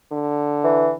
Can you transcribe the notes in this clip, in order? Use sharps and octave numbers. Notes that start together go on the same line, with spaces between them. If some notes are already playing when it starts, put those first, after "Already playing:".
D3
E3